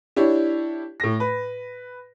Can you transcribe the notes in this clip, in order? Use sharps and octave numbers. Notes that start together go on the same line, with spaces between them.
D4 E4 G4 C#5
A2 A#6
B4